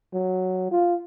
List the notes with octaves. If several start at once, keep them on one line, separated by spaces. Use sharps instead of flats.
F#3
F4